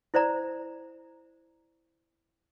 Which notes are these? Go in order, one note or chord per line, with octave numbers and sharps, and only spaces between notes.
E4 C5 D5 A#5